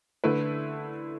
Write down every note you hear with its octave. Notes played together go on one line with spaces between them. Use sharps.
D3 A3 E4 B4